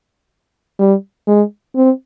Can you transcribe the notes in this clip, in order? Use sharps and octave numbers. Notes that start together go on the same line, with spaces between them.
G3
G#3
C4